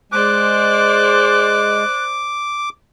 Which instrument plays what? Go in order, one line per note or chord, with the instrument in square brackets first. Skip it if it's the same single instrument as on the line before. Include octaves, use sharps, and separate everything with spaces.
[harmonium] G#3 [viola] C5 D5 [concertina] D6 [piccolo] F#6